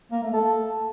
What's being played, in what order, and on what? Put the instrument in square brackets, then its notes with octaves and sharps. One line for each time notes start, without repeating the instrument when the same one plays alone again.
[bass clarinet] A#3
A3
A4